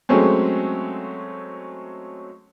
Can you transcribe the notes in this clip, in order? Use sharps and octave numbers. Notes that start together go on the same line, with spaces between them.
F#3 G#3 A3 C4 C#4